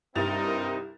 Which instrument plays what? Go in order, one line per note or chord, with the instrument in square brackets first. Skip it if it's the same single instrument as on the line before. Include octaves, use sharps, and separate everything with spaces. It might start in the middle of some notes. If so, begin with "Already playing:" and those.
[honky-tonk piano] C2 A6 F7 [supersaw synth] G2 A#4 [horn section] C4 D#4